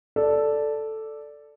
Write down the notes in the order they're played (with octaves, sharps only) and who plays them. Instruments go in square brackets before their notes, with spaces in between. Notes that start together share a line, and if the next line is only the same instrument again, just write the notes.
[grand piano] A4 D5